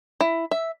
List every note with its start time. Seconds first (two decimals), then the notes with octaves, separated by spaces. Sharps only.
0.21 E4
0.51 E5